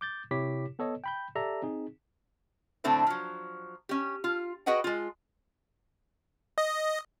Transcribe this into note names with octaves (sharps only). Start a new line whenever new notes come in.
D6 G6 A6
C3 E4 G4 C#5 D6 B6
B3 A4 C#5 D#5
G5 B5 G6
G4 A4 D5 E5 A#5
C4 D#4 G#4
A2 D3 A3 C4 D4 E4
F3 F#3
C#4 G4
F4
F#4 G#4 B4 D#5 F#5 G5
G#3 F4
D#5